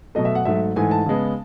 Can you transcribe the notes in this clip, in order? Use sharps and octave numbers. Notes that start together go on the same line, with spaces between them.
B2 F#3 A3 D#5
E5
F#5
G#2 F#3 A3 E5
G#2 E3 A3 G#5
A5
C#3 G#3 B3